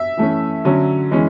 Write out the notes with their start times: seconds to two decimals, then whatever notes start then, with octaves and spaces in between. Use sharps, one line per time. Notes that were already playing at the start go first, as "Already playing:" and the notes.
Already playing: E5
0.17 E3 A3 C#4
0.65 D3 F#3 C#4
1.11 E3 G#3 C#4